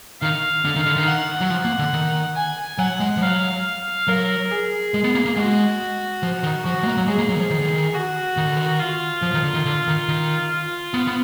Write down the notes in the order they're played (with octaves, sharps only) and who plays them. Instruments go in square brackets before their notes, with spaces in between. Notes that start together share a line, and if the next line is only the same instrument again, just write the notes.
[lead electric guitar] D#3 [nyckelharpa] F5
[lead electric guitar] D3
D#3
D3
D#3
[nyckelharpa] F#5
[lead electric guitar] F#3
F3
A#3
D3
D#3
[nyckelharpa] G#5
[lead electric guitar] F#3 [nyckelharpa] F#5
[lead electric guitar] G#3
F3
[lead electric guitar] F#3 [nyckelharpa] F5
[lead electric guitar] F#3 [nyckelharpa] A#4
[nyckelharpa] G#4
[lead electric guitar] G#3
B3
A#3
A#3
[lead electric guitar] G#3 [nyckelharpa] F#4
[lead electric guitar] F3
D#3
[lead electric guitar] F3 [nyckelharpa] F#4
[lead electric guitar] G#3
A#3
F#3
[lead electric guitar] G#3 [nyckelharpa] G#4
[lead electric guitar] A#3
F#3
D#3
F3
D#3
D3
D#3
[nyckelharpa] F#4
[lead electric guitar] D#3
D3
D#3
[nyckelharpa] F4
[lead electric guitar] F3
D#3
D3
D#3
D3
D#3
D#3
[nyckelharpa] F4
[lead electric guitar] B3
B3